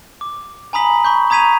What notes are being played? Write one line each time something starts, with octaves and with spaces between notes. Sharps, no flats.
D6
G#5 A#5 B5 D#6 B6 F#7
B5 C#6 G6
A#5 D#6 G#6 B6 D#7 F7